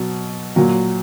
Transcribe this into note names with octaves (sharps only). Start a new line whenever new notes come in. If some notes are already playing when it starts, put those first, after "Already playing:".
Already playing: B2 F#3
A#2 F#3